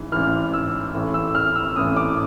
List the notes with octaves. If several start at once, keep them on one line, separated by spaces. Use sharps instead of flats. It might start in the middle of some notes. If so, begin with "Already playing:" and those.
Already playing: A1 G#2 E3
A1 G#2 E3 F6
E6
A1 A2 E3
E6
F6
E6
A1 A2 E3 D#6
D6